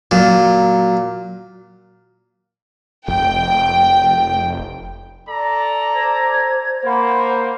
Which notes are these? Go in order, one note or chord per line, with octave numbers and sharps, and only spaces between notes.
A#2 F#3
F1 G5
A4 D5 A#5
C5 G#6
A#3 C5 F#5 B5